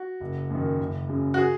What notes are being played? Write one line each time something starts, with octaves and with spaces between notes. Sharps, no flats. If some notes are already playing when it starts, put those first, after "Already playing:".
Already playing: F#4
F#1
F#2 D#3
F#1
F#2 C#3
F#4
G#4